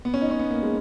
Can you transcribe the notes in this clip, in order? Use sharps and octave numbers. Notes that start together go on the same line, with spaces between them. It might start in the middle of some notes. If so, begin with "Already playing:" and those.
B3
C#4
D#4
C#4
B3
A#3
G#3